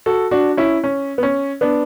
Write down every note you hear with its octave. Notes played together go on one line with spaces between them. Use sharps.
F#4 A4
D4 F#4
C#4 E4
C#4
B3
C#4
B3 D4